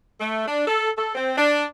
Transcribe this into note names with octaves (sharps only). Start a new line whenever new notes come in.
A3
D4
A4
A4
C4
D4